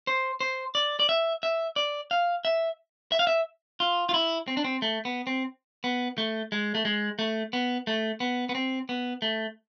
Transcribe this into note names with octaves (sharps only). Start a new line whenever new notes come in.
C5
C5
D5
D5
E5
E5
D5
F5
E5
E5
F5
E5
F4
F4
E4
C4
D4
C4
A3
B3
C4
B3
A3
G#3
A3
G#3
A3
B3
A3
B3
B3
C4
B3
A3